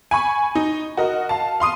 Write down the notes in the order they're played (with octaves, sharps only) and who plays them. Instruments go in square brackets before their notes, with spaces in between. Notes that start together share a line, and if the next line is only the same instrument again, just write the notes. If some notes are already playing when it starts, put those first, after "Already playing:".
[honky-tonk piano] G#5 B5 C#6
D#4
F#4 A#4 D#5
F5 A5
F5 C6 D#6 D#7